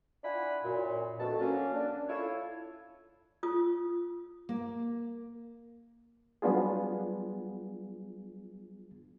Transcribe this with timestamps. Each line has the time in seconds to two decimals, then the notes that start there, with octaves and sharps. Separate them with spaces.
0.23 D4 E4 F4 F#5 G#5 B5
0.64 F#2 A#2
1.19 F2 B2 A3 D4 A4 A5
1.38 F#3 A#3 C#4
1.73 D4
2.09 E4 F4 A4 C#5
3.43 F4 D#6
4.49 A#3
6.42 F#3 G3 B3 D4 F4 G#4